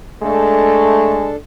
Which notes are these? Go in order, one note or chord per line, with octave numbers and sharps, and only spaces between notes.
G#3 A3 D4 A4